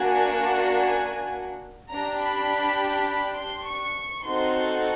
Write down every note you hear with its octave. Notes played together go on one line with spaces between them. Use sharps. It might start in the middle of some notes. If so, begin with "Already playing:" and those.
Already playing: A#3 D4 F#4 G#5
G#5
D4 G4 A#5
B5
B5
C6
C#6
C4 D#4 F#4 A4 C6